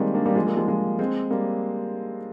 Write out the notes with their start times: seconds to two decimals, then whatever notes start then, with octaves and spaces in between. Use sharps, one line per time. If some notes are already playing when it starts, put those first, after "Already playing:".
Already playing: D#3 G3 G#3 A#3 C4
0.14 A#3 D4
0.25 G3 A#3
0.35 F3 G#3
0.47 G3 A#3
0.57 F3 G#3
0.68 F3 G#3
0.99 G#3 C4
1.31 G3 A#3